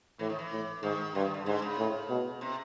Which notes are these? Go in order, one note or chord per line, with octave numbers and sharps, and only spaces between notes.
A2 E3
D#3
E3
A2
G#2 D#3
G2 D3
D#3
D3
G#2 D3
C#3
A2
B2
C3